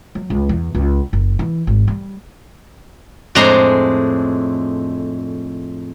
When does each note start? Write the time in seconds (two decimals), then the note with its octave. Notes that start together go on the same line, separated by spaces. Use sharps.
0.15 F#3
0.30 C#2
0.49 E2
0.75 C#2
1.13 F#1
1.39 E3
1.67 G#1
1.88 G3
3.35 F2 A2 G#3 D4 A#5 C6